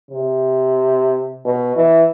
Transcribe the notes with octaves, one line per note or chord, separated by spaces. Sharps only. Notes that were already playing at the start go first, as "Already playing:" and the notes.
C3
B2
E3